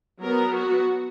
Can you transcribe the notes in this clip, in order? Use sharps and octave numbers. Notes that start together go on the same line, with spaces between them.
F#3 B3 A#4
F#4